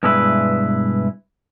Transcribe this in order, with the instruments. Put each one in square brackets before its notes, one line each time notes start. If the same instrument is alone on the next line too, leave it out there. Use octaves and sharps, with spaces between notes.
[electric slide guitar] G2 B2 G#3 E4 B4 E5